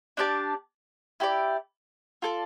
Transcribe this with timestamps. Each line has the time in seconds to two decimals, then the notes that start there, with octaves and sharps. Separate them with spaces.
0.17 D4 G4 D5 A5
1.20 E4 G4 D5
2.22 F4 A4 D5